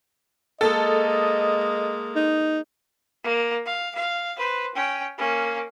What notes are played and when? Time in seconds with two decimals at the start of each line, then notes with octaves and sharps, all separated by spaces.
0.61 G#3 A#3 A4 D#5
2.16 D#4
3.24 A#3
3.65 F5
3.95 F5
4.37 B4 C5
4.75 C#4 G5
5.18 A#3 C#4